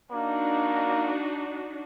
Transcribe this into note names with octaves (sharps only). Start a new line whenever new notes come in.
A#3 D4 D#4 F#4